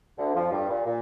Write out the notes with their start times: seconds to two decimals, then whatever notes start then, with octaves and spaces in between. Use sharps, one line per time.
0.18 D2 D3
0.34 F2 F3
0.51 G2 G3
0.68 A#2
0.85 A#2